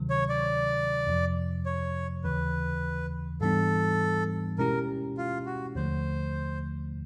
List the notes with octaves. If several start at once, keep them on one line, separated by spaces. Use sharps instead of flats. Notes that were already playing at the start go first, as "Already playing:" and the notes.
Already playing: D2 C3 D#3 F#3
C#5
D5
F2 C3 F3
C#5
D#2 C#3 E3 B4
G#2 E3 G3 B3 D4 A4
B2 G#3 C#4 E4 G4 A#4
F4
F#4
D#2 D3 F3 A3 C5